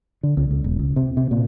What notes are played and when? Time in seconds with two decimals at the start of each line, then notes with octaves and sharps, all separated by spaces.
0.23 D3
0.37 C#2
0.51 C#2
0.64 E1
0.79 C#2
0.96 C3
1.17 C3
1.31 A#2